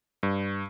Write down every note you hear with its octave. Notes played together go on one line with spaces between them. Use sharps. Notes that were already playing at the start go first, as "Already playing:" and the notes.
G2